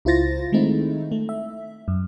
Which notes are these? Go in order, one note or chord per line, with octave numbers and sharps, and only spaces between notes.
C#2 E4 F4 C5 A6 A#6
D#3 G#3 A3 C4 D#4 E4
A3
E5
F#2